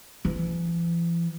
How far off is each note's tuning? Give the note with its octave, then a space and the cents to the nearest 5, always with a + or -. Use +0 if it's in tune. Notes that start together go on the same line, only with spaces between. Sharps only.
E3 +40